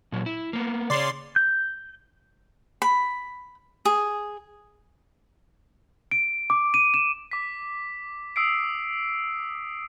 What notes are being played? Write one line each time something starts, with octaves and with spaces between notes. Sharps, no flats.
A#2 F#3
E4
A#3 B3
C#3 G#4 C#5 D5 C6
G6
B5
G#4
D7
D6
D#7
E7
D6 B6
D#6 E6 C7 D7